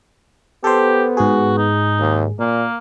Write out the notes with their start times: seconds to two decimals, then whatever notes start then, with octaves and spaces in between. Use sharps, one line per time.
0.64 B3 G4 A4 C5
1.17 G#2 F#4 G#4
1.58 D#4
2.00 D#2
2.39 A#2 A#3